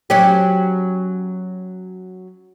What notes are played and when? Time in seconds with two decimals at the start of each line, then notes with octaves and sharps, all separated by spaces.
0.10 F#3 C#4 G4